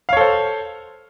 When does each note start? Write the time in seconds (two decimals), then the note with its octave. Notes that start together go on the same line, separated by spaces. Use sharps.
0.09 F5
0.13 C#5
0.17 A4
0.21 C5